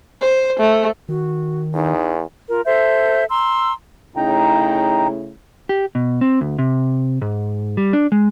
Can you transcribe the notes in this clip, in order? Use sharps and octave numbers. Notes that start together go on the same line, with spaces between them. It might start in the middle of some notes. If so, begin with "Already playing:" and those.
C5
A3
D#3 F#4
E2 D#4
F4 A#4
A4 C5 E5 G6
A#5 C6 E6
C#3 A3 D#4 E4 G5 A#5
G4
B2
C4
D2
C3
G#2
G3
D4
G#3